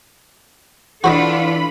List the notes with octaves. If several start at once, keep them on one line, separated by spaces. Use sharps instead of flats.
E3 D4 F4 F#4 A4 C5 D#5 B5